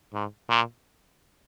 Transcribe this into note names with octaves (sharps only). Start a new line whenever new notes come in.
G#2
A#2